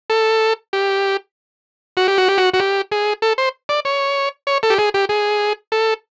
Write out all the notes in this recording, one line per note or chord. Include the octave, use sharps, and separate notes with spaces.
A4
G4
F#4
G4
F#4
G4
F#4
F#4
G4
G#4
A4
C5
D5
C#5
C#5
A4
G4
G#4
G4
G#4
A4